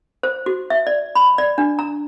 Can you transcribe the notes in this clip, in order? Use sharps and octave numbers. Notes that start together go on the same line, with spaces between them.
C5
F#4
E5
D5
B5
D5
D4
A#5